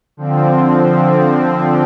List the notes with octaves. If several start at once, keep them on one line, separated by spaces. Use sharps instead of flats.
D3 F3 C4